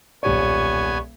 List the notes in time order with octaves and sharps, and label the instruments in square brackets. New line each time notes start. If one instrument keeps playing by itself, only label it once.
[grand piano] D#1 C#5 [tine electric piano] B1 G4 D5 [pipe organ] B3 G#5 [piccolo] C#6